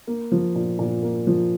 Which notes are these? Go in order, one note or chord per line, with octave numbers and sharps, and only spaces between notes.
A#3
F3
A#2
A#2
A#3
F3